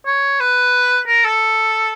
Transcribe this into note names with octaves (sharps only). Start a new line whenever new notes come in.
C#5
B4
A#4
A4